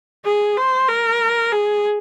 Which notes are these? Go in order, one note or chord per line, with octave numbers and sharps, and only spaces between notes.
G#4
C5
A#4
G#4